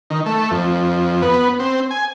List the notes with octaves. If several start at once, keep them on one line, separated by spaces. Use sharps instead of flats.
D#3
A3
F2
B3
C4
G#5